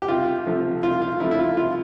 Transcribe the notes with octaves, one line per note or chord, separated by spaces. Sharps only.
G4
C2 F4
C3 F3 A3
C2 F4
F4
C3 F3 A3 E4
E4
F4
C2 F4